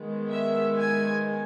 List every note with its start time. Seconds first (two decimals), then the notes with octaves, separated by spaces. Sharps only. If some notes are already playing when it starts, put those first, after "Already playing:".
Already playing: D#3 G#3 B3
0.32 E5
0.79 G#5